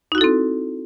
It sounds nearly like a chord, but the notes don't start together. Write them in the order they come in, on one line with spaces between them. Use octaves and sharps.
D#4 F#4 E4 A4 C4